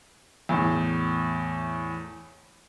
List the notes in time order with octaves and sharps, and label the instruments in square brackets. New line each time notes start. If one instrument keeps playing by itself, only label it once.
[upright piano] E2 A2